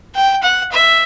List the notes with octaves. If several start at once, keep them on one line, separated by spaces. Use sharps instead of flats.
G5
F#5
E5